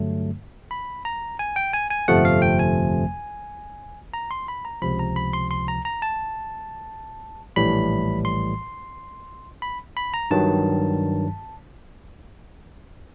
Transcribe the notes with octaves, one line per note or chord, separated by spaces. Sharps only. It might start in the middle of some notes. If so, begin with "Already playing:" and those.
Already playing: G2 D3 F#3 A3
B5
A#5
G#5
G5
G#5
G#5
G1 F2 C3 F3 A3 F#5
F5
G5
G#5
A#5
C6
B5
A#5
C#2 C3 F3 B5
A#5
B5
C6
C6
A#5
A#5
A5
A#1 A2 E3 G3 B5
C6
B5
B5
A#5
G2 D#3 F#3 A5